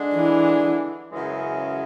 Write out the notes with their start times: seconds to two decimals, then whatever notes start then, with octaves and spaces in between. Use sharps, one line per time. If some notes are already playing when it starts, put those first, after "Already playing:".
Already playing: D3 G#3 D4
0.15 E3
1.09 F#2 C#3 E3 G#3 C#4